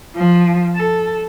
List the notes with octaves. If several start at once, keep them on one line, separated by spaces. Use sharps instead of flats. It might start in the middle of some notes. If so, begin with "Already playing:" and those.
F3
A4